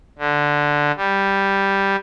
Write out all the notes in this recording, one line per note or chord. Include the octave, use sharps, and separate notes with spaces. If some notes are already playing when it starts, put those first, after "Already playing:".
D3
G3